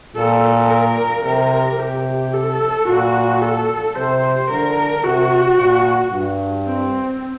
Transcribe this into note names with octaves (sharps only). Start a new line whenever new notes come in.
A#2 A4
A#4
C3 A#4
C3 G4
A4
A#2 F#4
A4
C3 C5
D3 A#4
C3 F#4
A#2
G2
C4